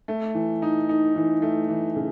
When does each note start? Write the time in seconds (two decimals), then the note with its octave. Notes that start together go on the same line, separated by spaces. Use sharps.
0.08 A3
0.35 E3
0.62 D#4
0.89 D#4
1.16 E3
1.42 A3
1.69 E3
1.96 C#3